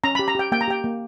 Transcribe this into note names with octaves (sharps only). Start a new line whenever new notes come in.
C#4 A#5
B5
G4
A#5
G4 G5
A#3 G5
A#5
G4 G5
A#3